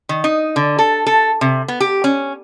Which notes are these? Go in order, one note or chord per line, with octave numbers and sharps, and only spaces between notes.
D#3
D#4
D3
A4
A4
C3
B3
G4
C#4